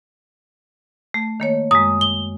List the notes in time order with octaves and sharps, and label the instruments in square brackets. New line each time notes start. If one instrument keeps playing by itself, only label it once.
[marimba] A3
D#3 A#3 C#5
[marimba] F#2 G#3 [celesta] D#6
[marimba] D#6 [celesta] G7